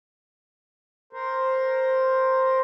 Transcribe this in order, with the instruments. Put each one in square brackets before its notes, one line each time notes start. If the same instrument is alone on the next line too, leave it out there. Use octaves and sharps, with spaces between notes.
[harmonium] A#4 C5